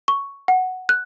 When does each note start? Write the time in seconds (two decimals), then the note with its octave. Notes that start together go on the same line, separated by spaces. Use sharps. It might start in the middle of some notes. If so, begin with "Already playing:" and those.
0.08 C#6
0.48 F#5
0.89 F#6